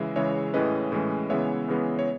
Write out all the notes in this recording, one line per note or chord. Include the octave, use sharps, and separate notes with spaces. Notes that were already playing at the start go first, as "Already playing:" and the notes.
Already playing: C#3 E3 G#3 E5
C#3 E3 G#3 C#5 E5
A2 E3 G#3 C#4 B4 D#5
A2 E3 G#3 C#4
C#3 E3 G#3 B3 C#5 E5
C#3 E3 G#3 B3
C#5